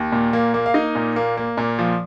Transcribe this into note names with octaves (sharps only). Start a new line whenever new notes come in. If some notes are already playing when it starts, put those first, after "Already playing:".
Already playing: D#2
A#2
A#3
A#3
F5
A#3 D#4 D#5
A#2
A#3
A#3
A#2
F3